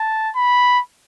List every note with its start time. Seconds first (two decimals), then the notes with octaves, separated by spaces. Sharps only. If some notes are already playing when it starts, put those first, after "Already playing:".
Already playing: A5
0.36 B5